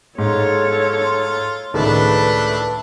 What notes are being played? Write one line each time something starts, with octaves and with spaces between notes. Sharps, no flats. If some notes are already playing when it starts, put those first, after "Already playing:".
G#2 F4 A4 C#5
C#2 A2 D#3 A3 D4 B4